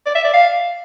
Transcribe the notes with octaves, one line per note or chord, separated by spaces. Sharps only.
D5
E5
D5
F5